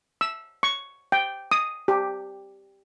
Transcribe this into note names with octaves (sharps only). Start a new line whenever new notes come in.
E6
C#6
G5
D#6
G4